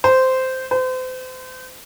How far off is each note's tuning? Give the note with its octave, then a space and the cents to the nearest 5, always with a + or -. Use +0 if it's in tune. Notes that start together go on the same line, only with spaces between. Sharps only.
C5 -10
C5 -35